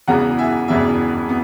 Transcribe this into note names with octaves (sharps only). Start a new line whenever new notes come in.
E1 E2 C#3 E3 B3 F#5 A#5
E5 G#5
E1 E2 C#3 E3 B3 E5 G#5
B3